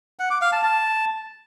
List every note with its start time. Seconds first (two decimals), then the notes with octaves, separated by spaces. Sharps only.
0.19 F#5
0.30 D6
0.41 F5
0.52 A5
0.63 A5